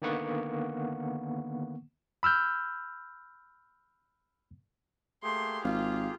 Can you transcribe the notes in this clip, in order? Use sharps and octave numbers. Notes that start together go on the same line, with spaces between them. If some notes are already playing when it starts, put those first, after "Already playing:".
D3 D#3 A#3 B3 F#5 C#6
B5 E6 F6 G6
A3 A#3 G4 G#4 C6
G#1 F4 F5